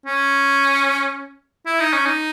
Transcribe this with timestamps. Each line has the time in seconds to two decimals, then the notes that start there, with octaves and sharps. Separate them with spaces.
0.06 C#4
1.67 E4
1.80 D#4
1.93 C#4
2.06 D#4